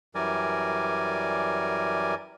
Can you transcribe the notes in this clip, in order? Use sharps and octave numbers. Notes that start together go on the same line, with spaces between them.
F#2 E3 G3 A#4 D5 G#5